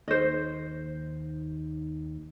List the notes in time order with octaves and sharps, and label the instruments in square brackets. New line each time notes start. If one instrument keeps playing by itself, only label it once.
[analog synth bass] D#2 [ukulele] C5 D#5